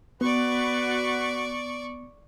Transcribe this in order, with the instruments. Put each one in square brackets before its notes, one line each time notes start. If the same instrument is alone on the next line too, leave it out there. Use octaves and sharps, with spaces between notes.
[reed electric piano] B3 [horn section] F#4 B4 [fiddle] D5 C#6